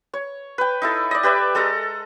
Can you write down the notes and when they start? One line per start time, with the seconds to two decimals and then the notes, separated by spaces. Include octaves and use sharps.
0.13 C#5
0.58 B4 G5
0.82 D#4 E4 A4
1.11 D5 D#5
1.23 G4 B4 D5 E5
1.55 G#3 A4 D#5 A#5